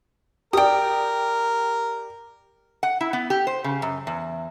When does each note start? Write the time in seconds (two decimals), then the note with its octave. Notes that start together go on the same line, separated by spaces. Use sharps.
0.53 G4 A#4 D5 G5 D#6
2.83 F#5
3.01 E4
3.13 B3
3.30 G4
3.47 C5
3.64 C#3
3.82 F#2
4.07 E2